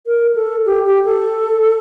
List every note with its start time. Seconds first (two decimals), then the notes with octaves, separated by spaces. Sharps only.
0.06 A#4
0.35 A4
0.66 G4
0.86 G4
1.05 A4